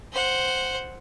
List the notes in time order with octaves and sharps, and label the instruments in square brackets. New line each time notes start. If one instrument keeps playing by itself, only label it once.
[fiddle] C5 F#5